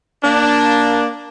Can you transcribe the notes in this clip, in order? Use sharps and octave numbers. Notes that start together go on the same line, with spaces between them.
A#3 D4